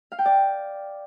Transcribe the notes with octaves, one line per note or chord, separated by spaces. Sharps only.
F5
G5
D5